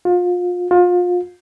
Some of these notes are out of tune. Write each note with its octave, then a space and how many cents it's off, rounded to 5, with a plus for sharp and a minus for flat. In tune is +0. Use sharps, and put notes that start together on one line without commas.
F4 +30
F4 +30